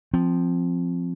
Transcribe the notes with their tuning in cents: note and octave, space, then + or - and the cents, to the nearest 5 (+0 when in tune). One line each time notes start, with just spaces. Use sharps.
F3 +0 C4 +0